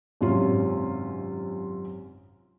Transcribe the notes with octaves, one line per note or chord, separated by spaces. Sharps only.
G#1 F#2 C3 C#4 F4